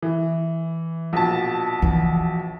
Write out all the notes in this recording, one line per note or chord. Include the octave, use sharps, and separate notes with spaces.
E3
A#1 B2 A5
E3 F3